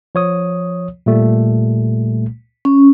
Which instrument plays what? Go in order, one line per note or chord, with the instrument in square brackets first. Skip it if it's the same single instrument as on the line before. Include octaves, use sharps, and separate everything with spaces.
[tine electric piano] F3 C#5 D#6
A#2 G3 A3
[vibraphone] C#4